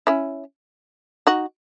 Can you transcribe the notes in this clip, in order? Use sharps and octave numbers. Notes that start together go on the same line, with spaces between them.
C#4 E4
D#4 F#4